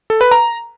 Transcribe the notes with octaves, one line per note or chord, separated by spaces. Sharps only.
A4
B4
A#5